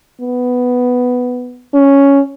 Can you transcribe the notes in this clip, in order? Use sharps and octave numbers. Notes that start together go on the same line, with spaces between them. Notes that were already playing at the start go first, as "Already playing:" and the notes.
B3
C#4